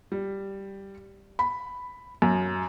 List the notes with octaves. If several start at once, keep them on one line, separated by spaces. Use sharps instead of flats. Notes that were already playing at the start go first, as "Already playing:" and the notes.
G3
B5
F#2